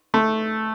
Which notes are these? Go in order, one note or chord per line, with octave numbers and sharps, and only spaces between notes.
A3